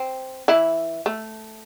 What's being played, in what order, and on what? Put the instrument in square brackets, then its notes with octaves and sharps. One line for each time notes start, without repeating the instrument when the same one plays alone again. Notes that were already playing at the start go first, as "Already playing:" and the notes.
Already playing: [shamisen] C4
E3 E4
A3